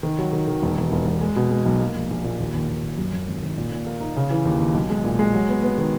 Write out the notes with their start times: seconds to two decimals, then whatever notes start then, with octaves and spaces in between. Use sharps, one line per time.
0.03 D#3
0.19 F#3
0.33 D#3
0.48 D#3
0.62 E1
0.78 E1
0.92 E1
1.07 E1
1.21 G#3
1.36 B2
1.51 G#3
1.66 B1
1.80 A#3
1.95 A#1
2.10 A#1
2.24 A#2
2.40 D#2
2.54 D#2
2.69 D#2
2.83 D#2
2.98 F#2
3.13 F#2
3.28 G#1
3.43 D#3
3.57 A#2
3.72 A#2
3.87 A#3
4.00 D#4
4.16 C#3
4.31 E3
4.45 D#2
4.60 D#2
4.74 B1
4.90 G#3
5.04 A#2
5.19 G#3
5.34 F#3
5.49 B3
5.63 B3
5.78 D#3